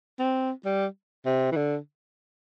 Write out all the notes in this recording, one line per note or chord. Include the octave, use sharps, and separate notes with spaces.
C4
G3
C3
E3
D3